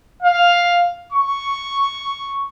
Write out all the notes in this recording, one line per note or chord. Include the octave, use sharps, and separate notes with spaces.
F5
C#6